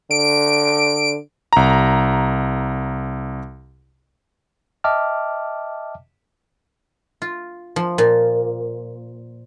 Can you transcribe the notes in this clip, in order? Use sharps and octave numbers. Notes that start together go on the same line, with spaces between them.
D3 D7
C2 A#5
D#5 E5 G5 A5 D6 F6
F4
F3
A#2